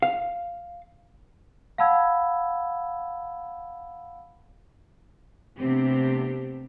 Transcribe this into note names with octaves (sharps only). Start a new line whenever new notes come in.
F5
F5 F#5 A5 B5 E6 G#6
C3 A3 B3 C4 D4 G4